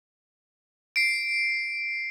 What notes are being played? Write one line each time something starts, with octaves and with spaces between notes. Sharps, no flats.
C7 D7